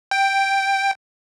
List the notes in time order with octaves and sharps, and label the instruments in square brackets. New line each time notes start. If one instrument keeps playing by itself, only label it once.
[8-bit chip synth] G5